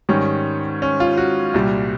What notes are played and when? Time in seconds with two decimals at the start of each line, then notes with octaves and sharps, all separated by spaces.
0.09 G#2 D#3 G3 C#4
0.82 C#4
1.00 F4
1.17 F#4
1.54 C2 A#2 G3